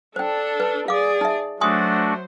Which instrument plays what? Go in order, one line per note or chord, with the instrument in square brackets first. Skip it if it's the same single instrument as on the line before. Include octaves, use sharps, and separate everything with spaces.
[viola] D4 A4 [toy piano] C5 G5
[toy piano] B4
[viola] G#4 D5 [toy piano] F5 D6
[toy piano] D#4 E5
[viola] F#3 C5 [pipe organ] A3 D4 F#4 [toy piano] G#5 C6 D#6